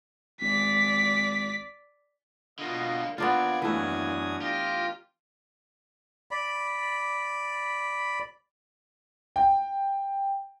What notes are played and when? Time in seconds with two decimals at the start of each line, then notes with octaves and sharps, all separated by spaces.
0.42 G#1 D5 B6
2.59 B2 D3 A#3 F4 D#5
3.18 D#2 B3 D4 F4 D5 G#6
3.62 F#2 E3 A3 D4 D#6 G#6
4.41 F4 G4 A#4 D#5
6.31 D5 B5
9.36 G5